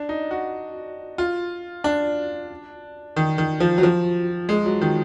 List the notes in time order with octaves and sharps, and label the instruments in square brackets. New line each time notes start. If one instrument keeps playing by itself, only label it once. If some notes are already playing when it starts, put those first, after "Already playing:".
Already playing: [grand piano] D4
D#4
F#4
F4
D4
D#3
D#3
F3
F#3
F3
G#3
F#3
D#3